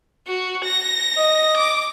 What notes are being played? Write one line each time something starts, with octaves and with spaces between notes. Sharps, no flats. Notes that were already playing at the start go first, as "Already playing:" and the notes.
F#4
A#6
D#5
D6